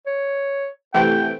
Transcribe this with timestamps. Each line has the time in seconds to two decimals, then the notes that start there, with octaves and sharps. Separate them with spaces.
0.06 C#5
0.94 C3 E3 A3 G5